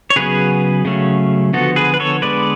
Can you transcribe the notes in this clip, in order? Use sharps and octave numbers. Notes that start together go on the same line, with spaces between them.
C#5
C#3 F#3 B3 G#4 B4
C#3 F#3 A3 C#4
D3 F3 B3 F#4 A4
G#4 B4
B4
A4 C#5
D3 G#3 B3 B4 D5